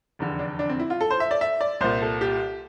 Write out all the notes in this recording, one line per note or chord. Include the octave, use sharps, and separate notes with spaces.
F1 E2 D3
D4
D4
C4
E4
F4
A4
C5
E5
D5
E5
D5
C2 A#2 C5
A4
G4